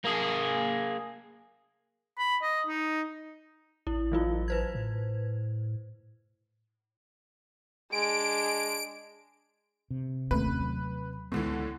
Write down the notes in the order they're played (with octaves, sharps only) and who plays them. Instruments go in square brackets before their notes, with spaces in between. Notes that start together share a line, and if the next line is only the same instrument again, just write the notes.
[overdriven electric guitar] A#3 G#4
[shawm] B5
D#5
D#4
[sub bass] A1 [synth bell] E4
[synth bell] E3 F#3 F4
B4 C5 G#6
[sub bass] A2
[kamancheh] G#3 D4 [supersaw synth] D7
[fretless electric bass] C3
[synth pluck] D#2 A3 [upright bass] C4 C#4 [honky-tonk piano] B4
[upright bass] F#3
[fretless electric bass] C#2 G#3 B3 [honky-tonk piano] A2 D3 E3